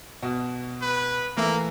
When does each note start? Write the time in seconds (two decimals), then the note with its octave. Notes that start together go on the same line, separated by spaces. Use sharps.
0.22 B2 F#4
0.82 B4
1.37 E3 A3 A#3 E4